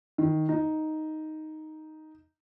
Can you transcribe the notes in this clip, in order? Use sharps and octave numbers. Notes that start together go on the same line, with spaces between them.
D#3
D#4